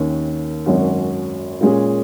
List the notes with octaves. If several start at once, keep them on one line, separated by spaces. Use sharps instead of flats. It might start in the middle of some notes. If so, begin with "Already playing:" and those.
Already playing: D#2 D#3 A#3 C#4
G#1 F#2 F#3 C#4 F#4
A#2 G#3 C#4 G#4